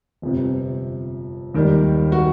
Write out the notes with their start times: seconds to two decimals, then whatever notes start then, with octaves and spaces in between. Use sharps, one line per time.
0.22 G1 F2 C3 F3
1.54 D#2 D#3 G3
2.12 F#4